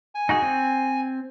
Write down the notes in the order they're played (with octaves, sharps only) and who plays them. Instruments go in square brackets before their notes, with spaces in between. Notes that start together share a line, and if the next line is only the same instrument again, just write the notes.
[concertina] G#5
[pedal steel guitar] D#4 F#4 G#4
C4